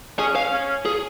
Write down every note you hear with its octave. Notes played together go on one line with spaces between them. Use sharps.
C#4 G#4
F5
C#4
G#4